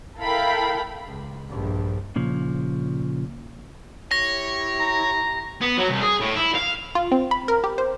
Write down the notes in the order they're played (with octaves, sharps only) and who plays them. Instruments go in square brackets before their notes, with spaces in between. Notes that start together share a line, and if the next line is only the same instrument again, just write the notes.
[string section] E4 A4 A#4 F5 G5 B5
[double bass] C#2
A#1 G2
[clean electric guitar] A#2 C#3 F3
[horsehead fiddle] E4 G4 [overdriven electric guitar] C#5 [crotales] A#6
[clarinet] A#5
[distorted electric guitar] B3
F#3
C2
G#4
A2
E4
F5
[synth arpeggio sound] F4
C4
B5
A#4
G4
C5